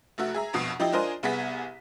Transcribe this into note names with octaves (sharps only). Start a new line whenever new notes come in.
F1 A3 F#4 E5
G#4 E5 A#5
A#1 F2 B2 D#6 C7
F3 D#4 E4 G4 D#5
D4 F4 A#4 C5 D#5 G#5
C2 B3 G#4 B6